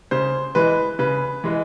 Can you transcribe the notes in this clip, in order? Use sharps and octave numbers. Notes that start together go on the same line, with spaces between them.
C#3 C5
E3 G#3 B4
C#3 B4
E3 G#3